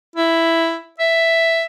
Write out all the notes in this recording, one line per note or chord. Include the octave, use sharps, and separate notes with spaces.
E4
E5